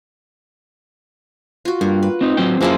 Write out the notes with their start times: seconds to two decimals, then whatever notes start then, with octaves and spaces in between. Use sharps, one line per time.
1.65 F4 F#4
1.81 G2 A#3
2.03 B4
2.21 C4 D#4
2.37 F#3 C4 G5
2.61 F#2 F3 G#3 A#3 E4 F4